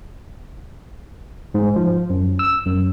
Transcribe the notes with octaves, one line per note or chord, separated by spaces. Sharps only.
G#2
F3
F#2
E6
F#2